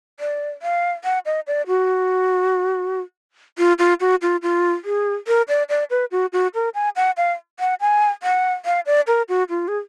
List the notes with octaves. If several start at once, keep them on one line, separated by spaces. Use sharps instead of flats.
D5
F5
F#5
D#5
D5
F#4
F4
F4
F#4
F4
F4
G#4
A#4
D5
D5
B4
F#4
F#4
A#4
G#5
F#5
F5
F#5
G#5
F#5
F5
D5
A#4
F#4
F4
G#4